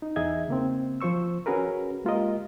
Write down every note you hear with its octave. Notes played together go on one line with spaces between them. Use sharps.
D#4
E2 D#4 G#4 D#5 E5 G#6
C#3 A#3 C4
F3 F4 C5 C#6 E6
C#4 F#4 G#4 A#4 B4
G#3 A#3 F4 G4 A#4 D#5